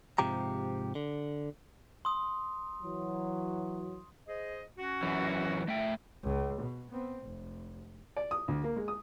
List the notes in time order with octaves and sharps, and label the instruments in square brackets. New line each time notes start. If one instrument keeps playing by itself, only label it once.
[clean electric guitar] G#2 C3 F3 G4 A#5
D3
[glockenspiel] C6 D#6
[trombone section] E3 F#3
[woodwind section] G#4 C5 D#5
C#4 F#4
[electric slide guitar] F#2 E3
A3 E5 G5
[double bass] C#2
B2
B3 C4
F1
[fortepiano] D5
D#6
D2
A#3
G#3
D#6